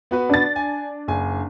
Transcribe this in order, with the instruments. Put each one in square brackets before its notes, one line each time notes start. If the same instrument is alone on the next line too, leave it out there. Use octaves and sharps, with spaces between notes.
[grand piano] B3 F#4 B4
[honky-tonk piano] D4 A6
[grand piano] G#5
F#1 G#5